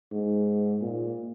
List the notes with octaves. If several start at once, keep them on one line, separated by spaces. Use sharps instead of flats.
G#2
A#2